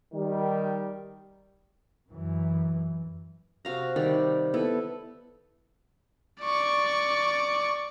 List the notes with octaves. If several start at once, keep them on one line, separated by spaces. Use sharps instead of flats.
D#3 G3
F#2 E3
C3 F#4 F5 A#5
D#3 G3 D5
B3 E4 A4
D5 C#6